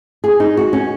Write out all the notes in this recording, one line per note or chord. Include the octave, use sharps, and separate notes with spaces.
G#4
D#4
F#4
C#4